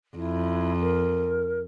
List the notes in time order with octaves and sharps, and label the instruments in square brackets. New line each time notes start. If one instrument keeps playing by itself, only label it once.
[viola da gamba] F2 [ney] E4
[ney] A#4